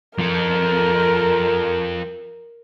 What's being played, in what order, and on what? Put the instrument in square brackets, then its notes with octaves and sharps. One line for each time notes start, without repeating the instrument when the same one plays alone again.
[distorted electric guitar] F3 A4 [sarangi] A#4